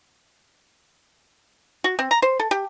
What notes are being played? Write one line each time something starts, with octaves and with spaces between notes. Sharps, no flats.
F#4
C4
A#5
C5
A4
G4